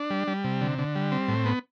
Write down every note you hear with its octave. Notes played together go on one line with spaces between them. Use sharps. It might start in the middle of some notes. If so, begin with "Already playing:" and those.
Already playing: D4
G3
G3
C3
D3
D3
G3
C4
A2
B3